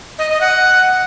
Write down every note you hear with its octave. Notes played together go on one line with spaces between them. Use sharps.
D#5
D#5
F#5